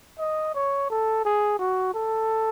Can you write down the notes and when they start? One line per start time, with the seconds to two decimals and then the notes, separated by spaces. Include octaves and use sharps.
0.19 D#5
0.54 C#5
0.90 A4
1.25 G#4
1.59 F#4
1.94 A4